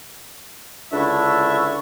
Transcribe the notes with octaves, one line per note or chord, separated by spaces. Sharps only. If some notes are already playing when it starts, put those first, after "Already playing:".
C#2 D3 D4 E4 E5 C#6